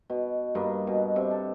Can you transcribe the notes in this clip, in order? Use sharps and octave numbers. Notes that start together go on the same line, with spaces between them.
B2
G2 A#3 D4 D#5
B2
C3
A4